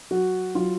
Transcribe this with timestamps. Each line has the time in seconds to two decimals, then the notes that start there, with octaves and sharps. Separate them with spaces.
0.11 F#3 F#4
0.55 F#3 F4